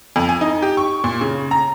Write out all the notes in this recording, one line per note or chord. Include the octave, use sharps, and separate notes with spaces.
F2
G#5
D#4
G4
C#6
A#2
C#3
A#5